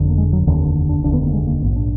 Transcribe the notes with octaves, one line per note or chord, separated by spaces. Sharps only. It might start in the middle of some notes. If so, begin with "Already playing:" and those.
Already playing: F#1 F2 D3
A#3
G#3
F#3
F1 D#2 D3 D#3
D4
F1 D#2 D3 D4
B3
A#3
G#3
A#3
A#1 G#2 B3
D4